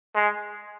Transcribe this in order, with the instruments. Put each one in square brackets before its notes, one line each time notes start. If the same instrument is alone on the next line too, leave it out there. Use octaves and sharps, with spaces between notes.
[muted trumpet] G#3